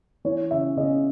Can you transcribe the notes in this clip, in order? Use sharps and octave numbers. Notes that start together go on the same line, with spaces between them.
E3 C#5
C#3 E5
C#3 D#5